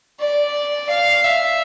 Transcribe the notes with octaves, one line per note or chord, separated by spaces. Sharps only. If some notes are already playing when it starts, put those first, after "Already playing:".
D5
F5
E5